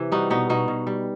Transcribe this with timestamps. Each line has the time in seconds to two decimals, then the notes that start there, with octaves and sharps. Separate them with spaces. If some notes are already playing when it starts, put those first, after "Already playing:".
Already playing: C3 E3
0.12 G3 D#4 F#4
0.30 B2 B3 D#4
0.49 B2 D#4 F#4
0.68 B2
0.87 G3